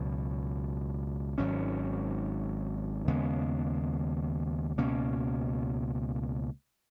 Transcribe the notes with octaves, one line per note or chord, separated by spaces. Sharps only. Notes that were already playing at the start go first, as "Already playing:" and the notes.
Already playing: C#2 B2 F#3
G#1 G#2 F#3 C#4
D#2 C#3 G#3 B3
C#2 B2 A#3 C#4